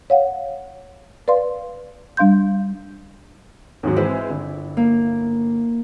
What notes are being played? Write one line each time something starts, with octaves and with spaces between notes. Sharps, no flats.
C#5 F5 F#5
B4 D5 F5 C6
G3 D4 F5 C6 G6
D#2 G#2 F#3
E3 G#3 C4 E4
G1
A#3